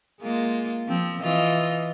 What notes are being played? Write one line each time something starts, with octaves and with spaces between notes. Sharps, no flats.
G#3 A#3 F4
F3 C4
E3 F4 D#5